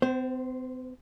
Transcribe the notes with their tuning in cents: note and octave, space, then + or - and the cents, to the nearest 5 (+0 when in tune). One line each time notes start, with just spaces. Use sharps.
C4 -45 C5 +0